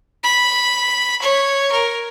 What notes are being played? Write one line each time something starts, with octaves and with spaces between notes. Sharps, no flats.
B5
C#5
A#4